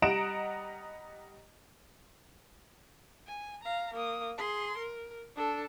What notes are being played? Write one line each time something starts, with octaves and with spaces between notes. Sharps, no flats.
G3 D#5 F#5 A#5 D7 E7
G#5
F5 A#5
A#3 D#6
G#4 C6
A#4
D4 A4